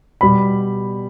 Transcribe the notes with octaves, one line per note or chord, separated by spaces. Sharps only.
B2 G3 B3 B5